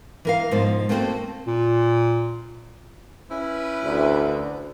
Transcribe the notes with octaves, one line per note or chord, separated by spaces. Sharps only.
E3 A#4 F5
G#2 B2 F3
A3 A#3 C4 D4 F#4 A4
A#2
C#4 E4 B4
D2